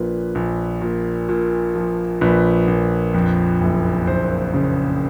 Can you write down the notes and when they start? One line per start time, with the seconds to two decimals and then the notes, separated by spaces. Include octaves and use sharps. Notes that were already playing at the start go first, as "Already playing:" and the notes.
Already playing: A#1 A#2 B4
0.35 A#1
0.81 A#2
1.29 A#2
1.75 F3
2.21 A#1 B4
2.68 A#1
3.14 F2
3.61 F#1
4.07 F#1 C5
4.54 C#3